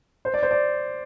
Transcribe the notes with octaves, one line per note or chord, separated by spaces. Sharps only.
C5
D5
C5
D5